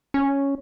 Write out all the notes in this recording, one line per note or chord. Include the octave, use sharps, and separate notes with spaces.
C#4